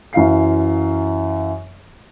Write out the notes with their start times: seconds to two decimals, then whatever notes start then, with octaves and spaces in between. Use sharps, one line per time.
0.13 F#2 E3 F5 C7